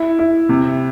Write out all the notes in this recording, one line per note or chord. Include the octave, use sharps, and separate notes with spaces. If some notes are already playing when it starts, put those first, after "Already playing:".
Already playing: E4
E4
C3